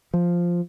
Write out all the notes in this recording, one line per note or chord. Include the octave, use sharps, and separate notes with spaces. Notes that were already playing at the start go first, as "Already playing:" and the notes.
F3